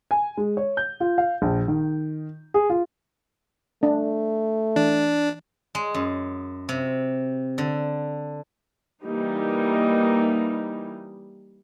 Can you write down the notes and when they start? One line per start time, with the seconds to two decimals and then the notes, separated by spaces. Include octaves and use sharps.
0.11 G#5
0.37 G#3
0.57 C#5
0.77 G6
1.00 F4
1.18 F5
1.42 A#1
1.68 D#3
2.54 G#4
2.70 F4
3.83 A3 D4
4.76 E3 D4
5.75 G#3
5.94 F#2
6.69 C3
7.58 D3
9.03 E3 G3 A#3 D#4